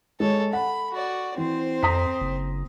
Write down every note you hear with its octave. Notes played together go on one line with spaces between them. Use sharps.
G#3 A4 C#5
F#5 B5
F#4 D5
E3 C4 C5
F2 A#5 D#6 B6
F#1